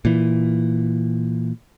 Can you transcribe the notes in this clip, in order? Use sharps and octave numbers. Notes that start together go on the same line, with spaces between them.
A#2 E3